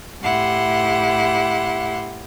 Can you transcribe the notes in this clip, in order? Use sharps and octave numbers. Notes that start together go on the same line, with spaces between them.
A2 E4 G4 F#5 C6